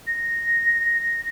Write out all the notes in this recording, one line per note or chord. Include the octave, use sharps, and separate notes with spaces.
A#6